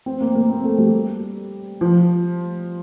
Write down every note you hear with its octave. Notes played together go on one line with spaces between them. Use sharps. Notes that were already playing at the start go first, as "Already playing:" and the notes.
C4
A#3
A#3
C4
A3
G3
F3